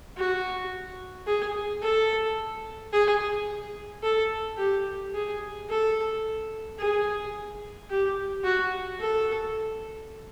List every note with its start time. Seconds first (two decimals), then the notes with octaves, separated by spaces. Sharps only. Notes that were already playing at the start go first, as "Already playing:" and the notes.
0.17 F#4
1.27 G#4
1.82 A4
2.92 G#4
4.03 A4
4.57 G4
5.13 G#4
5.69 A4
6.78 G#4
7.90 G4
8.44 F#4
9.00 A4